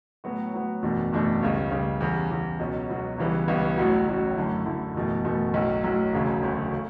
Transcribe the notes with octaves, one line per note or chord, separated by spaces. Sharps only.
A2 F#3 B3 F#4
A2 F#3 B3 F#4
F#1 E2 B2 A3 D4
F#1 E2 B2 A3 D4
C#2 C#3 G3
C#2 C#3 G3
E2 C#3 G3
E2 C#3 G3
C#2 B2 F#3 C#4 F#4
C#2 B2 F#3 C#4 F#4
C#2 C#3 E3 G3 B3
C#2 C#3 E3 G3 B3
A1 A2 F#3 C#4 F#4
A1 A2 F#3 C#4 F#4
F#2 D3 A3 E4
F#2 D3 A3 E4
F#1 E2 B2 A3
F#1 E2 B2 A3
B1 A2 F#3
B1 A2 F#3
E1 D2 C#3 F#3 A3
E1 D2 C#3 F#3 A3
C#3